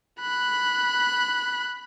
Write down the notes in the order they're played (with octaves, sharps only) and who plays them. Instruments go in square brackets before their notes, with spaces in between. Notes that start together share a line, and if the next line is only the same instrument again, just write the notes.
[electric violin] B5 F#6